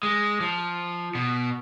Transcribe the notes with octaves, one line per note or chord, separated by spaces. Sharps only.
G#3
F3
B2